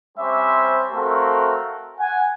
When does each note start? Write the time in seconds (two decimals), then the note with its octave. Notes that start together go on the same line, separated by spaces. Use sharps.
0.17 G3 C4 C#4 G4 C5 E5
0.91 A3 C4 F#4 A4 A#4 F5
1.97 F#5 G#5